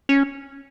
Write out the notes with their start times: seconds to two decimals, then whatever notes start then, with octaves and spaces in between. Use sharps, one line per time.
0.09 C#4